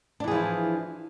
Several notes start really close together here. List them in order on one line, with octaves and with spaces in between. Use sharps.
D4 E3 G#4 F3 E4